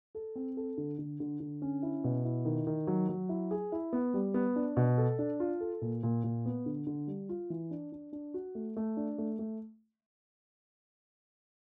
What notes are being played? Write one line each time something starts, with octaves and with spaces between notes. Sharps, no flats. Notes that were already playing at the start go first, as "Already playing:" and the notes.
A4
C4
A4
D3
D3
D3
D3
C#4
E4
B2
E4
D#3
D#3
F#3
F#3
E4
G#4
E4
B3
G3
B3
D4
B2
A4
D4
F4
A4
A#2
A#2
A#2
B3
D3
D3
G3
F4
E3
D4
D4
D4
F#4
A3
A3
D4
A3
A3